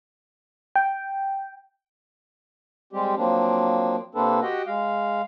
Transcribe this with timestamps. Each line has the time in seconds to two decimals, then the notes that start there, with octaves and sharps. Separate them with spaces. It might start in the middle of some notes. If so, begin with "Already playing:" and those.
0.76 G5
2.93 G3 G#3 C4 G4
3.17 F3 F#3 A#3 C4 D4
4.15 C3 A#3 C4 D4 A4 B4
4.42 F#4 G4 D#5 F#5 G5
4.67 G#3 F5